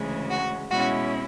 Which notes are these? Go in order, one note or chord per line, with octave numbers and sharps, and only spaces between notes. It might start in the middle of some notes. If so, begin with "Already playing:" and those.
Already playing: D2 C#3 E3 G#3
F#4
B2 G#3 C#4 E4 F#4